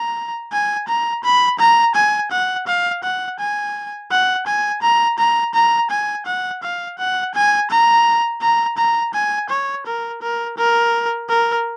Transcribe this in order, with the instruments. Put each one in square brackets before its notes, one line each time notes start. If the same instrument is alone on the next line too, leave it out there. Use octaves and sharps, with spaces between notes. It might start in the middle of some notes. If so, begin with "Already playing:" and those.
Already playing: [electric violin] A#5
G#5
A#5
B5
A#5
G#5
F#5
F5
F#5
G#5
F#5
G#5
A#5
A#5
A#5
G#5
F#5
F5
F#5
G#5
A#5
A#5
A#5
G#5
C#5
A#4
A#4
A#4
A#4